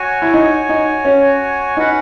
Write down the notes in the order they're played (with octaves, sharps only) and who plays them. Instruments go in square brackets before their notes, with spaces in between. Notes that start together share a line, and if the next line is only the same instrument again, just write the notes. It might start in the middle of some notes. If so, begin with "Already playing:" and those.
Already playing: [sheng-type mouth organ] F#4 C#5 G#5
[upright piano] E4
D#4
D#4
C#4
[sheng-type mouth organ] C#4 F#4 B4 F#5 [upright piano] D#4